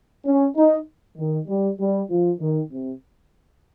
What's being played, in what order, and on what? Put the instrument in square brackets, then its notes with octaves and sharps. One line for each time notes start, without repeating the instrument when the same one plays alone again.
[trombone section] C#4
D#4
D#3
G3
G3
F3
D#3
C3